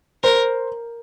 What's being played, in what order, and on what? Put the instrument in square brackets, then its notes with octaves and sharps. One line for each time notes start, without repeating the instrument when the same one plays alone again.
[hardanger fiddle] A#4 [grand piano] C5